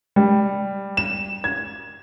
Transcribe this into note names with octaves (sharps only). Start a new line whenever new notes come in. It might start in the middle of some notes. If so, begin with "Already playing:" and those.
G3
E7
G#6